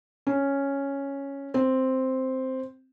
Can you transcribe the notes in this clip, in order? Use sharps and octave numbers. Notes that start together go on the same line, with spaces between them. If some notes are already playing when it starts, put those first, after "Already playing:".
C#4
C4